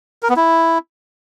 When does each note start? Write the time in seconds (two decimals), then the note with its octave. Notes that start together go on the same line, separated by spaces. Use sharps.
0.23 A#4
0.30 B3
0.36 E4